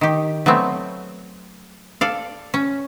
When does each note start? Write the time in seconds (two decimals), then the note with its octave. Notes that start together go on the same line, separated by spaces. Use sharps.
0.01 D#3 G4
0.46 F#3 A3 B3 C4
2.01 A4 D5 F5
2.54 C#4